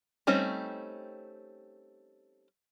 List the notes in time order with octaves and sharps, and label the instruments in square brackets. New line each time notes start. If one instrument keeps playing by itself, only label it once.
[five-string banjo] G3 A3 C4 C#4 D#4